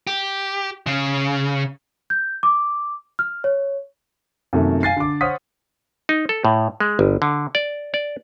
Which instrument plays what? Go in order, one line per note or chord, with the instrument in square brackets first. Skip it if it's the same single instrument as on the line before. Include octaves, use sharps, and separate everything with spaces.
[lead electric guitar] G4
C#3
[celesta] G6
D6
F6
C#5
[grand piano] F#2 C3 D#3 A3 A#3
F5 G#5 A6 C7
D3 D6
C5 C#5 F#5 D#6 F6 B6
[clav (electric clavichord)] D#4
A4
A2
G#3
G1
D3
D5
D5